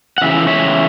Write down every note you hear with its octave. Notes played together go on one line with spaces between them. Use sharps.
F#5
C#3 E3 E5
C#5 E5